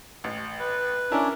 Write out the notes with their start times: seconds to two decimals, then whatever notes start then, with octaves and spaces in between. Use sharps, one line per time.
0.24 A1
0.59 B4
1.12 C#4 D4 E4 A#4